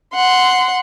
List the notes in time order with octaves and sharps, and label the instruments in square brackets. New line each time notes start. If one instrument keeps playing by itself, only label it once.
[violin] F#5 C6